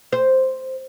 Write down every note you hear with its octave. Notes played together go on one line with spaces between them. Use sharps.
C5